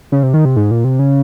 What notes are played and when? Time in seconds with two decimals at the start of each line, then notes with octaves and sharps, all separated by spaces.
0.12 C#3
0.23 C3
0.34 D#3
0.45 C3
0.56 G#2
0.71 A#2
0.84 C3
0.99 C#3